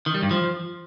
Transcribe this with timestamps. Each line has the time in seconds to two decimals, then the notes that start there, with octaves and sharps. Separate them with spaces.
0.06 D#3
0.14 G3
0.23 G2
0.31 F3